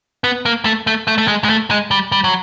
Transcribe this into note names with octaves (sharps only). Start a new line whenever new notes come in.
B3
A#3
A3
A3
A3
A3
G#3
G#3
A3
G#3
G3
G3
F#3